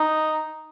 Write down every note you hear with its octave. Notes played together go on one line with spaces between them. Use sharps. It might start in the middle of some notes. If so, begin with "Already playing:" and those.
Already playing: D#4